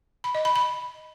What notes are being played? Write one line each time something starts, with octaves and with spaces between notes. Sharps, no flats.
B5
D#5
B5
B5